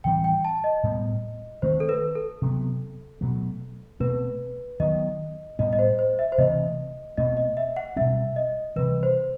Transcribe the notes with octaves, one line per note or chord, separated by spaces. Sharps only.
A2 E3 G3 C4 G5
G5
A5
D#5
A2 G3 B3
D#3 A3 C4 C5
A4
B4
A4
C3 F#3 B3
B2 F#3 A3
B2 A3 C4 B4
D#3 F#3 B3 D#5
A2 G3 B3 D#5
D#5
C5
C5
E5
C5
C3 E3 A3 C4 D#5
B2 A3 C4 D#5
D#5
E5
F#5
B2 G3 C4 E5
D#5
C3 E3 G3 B4
C5